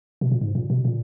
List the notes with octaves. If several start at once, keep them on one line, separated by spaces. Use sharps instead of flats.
B2
A#2
G#2
A#2
B2
A#2